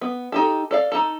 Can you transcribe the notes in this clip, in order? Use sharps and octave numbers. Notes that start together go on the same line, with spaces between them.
B3
D#4 G4 A4
A4 D5 F5
D#4 A4